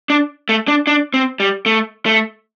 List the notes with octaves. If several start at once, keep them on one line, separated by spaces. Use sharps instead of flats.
D4
A3
D4
D4
C4
G3
A3
A3